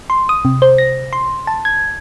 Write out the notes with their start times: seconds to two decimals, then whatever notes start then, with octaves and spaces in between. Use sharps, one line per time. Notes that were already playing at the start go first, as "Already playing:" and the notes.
0.10 C6
0.29 D#6
0.45 C3
0.62 C5
0.78 A#6
1.13 C6
1.47 A5
1.65 G#6